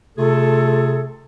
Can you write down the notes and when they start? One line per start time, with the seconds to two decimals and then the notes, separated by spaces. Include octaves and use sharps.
0.17 C3 A3 F4 G#4 A4